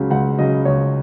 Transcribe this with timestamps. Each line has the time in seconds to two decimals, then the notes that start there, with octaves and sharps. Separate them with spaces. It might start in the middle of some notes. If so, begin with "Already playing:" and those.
Already playing: C#2 C#3 F#3
0.10 C#2 F#5
0.39 C#3 F#3 D#5
0.65 C#2 C#5